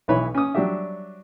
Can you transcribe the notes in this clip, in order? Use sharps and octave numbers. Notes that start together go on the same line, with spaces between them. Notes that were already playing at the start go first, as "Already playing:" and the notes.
B1 E3 E4 B4 C#5 B5
C#4 D#6
F#3 G3 D4 F#4 G4 E5